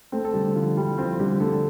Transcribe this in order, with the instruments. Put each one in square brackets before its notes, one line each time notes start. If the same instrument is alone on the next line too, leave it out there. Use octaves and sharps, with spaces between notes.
[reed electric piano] A3 A4 [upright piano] C4
[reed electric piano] A4
[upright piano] D3 [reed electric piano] G3 G4
[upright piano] D3 [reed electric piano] F3 F4
[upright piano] G3 [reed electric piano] E4
[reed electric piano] F3 F4 [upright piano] C4
[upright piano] D3 [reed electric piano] G3 G4
[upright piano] D3 [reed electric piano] A3 A4